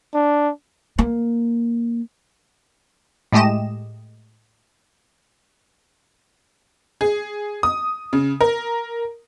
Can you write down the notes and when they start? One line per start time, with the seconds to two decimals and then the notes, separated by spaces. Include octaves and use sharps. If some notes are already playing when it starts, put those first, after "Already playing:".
0.14 D4
0.98 A#3
3.32 A2 G#3 A3 G4 D#5 E7
7.01 G#4
7.63 D#6
8.13 C#3
8.41 A#4